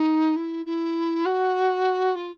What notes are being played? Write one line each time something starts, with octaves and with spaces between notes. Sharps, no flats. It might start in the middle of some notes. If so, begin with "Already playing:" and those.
Already playing: D#4
E4
E4
F#4
F4